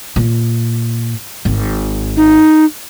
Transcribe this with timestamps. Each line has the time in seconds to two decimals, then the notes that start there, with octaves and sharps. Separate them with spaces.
0.16 A#2
1.45 G#1
2.17 D#4